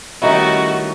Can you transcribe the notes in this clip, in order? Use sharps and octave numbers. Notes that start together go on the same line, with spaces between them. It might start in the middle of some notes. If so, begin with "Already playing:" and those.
D#3 G3 A3 C#4 D#4 E4 F#4